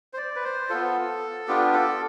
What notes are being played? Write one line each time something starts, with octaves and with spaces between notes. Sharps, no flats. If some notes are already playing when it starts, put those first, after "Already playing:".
C5
D5
B4
C5
B3 F4 A4
B3 D4 F4 G4
A4